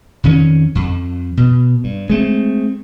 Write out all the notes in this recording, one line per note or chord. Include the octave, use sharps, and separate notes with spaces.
F2 D#3 C#4
F2
B2
G2
G#3 A3 C4